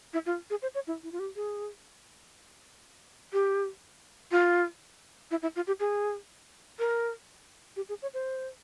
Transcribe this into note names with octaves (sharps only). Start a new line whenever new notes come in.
E4
F4
G#4
C5
C#5
E4
E4
F4
G4
G#4
G4
F4
E4
E4
F4
G4
G#4
A#4
G4
G#4
C#5
C5